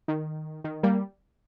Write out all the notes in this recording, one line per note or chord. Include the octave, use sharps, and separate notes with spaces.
D#3
D#3
G3 A#3